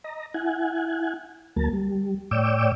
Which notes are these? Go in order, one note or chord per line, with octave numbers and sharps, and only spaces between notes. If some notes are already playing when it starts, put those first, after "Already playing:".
D#5 A#5
E4 F#5 G#5
D2 F#3 A#3 A#4 A5
G3
A2 C#5 D5 G5 D6 E6